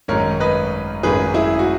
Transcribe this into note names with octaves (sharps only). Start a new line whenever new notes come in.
G#1 F#2 D#3 G#3 A#4 C#5
B4 D#5
G#1 F#2 D#3 G#3 G#4 B4
E4 G#4
F#4